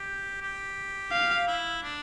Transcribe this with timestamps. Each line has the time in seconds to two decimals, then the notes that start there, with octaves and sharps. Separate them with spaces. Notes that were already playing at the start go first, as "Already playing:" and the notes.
Already playing: G4
0.41 G4
1.12 F5
1.47 E4
1.83 D4